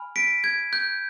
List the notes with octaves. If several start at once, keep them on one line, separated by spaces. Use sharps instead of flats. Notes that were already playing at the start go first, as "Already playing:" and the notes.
Already playing: G#5 B5 F6
B6 D7
G#6
G6